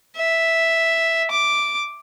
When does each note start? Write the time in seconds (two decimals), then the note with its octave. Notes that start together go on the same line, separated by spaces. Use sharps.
0.17 E5
1.31 D6